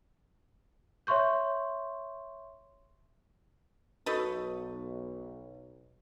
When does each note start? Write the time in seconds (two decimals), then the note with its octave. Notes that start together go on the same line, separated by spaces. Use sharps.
1.07 C#5 E5 C6 C#6 G6
4.06 B1 D#4 F#4 A4 B4 D#5 C#6